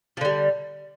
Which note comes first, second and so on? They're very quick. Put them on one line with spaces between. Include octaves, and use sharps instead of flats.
F3 D3 G3